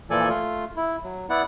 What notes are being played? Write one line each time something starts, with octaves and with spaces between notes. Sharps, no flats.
A#2 E3 F3 A4 D5 G#5
A3 F4
E4
F#3
B3 E4 D5 F#5